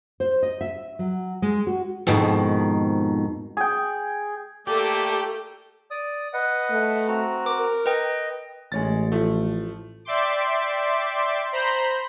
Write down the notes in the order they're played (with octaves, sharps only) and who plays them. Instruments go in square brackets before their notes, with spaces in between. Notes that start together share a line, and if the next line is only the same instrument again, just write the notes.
[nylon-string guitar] C5
D#5
E5
F#3
G#3
F#4
[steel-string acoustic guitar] F2 G#2 B2 D#3
[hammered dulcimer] G#4 G5
[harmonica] A3 A#3 D5 [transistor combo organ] G4 [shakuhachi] A4
[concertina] D5 D#6
B4 D#5 F#5
[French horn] A3
[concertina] C4 F#4 A#5
[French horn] A#4 [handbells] D6
[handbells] B4 G5 [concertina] D#5
[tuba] A1 [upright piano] G#3 C#5 A6
[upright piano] F3 A3
[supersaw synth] D5 E5 G5 C6 D6
C5 A#5 B5 G6